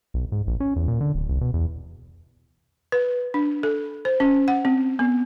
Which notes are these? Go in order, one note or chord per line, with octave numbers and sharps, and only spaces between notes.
B1
G#2
A#1
C#4
E2
A#2
D3
D1
C2
B2
E2
B4
D4
A4
C5
C#4
F#5
C4
B3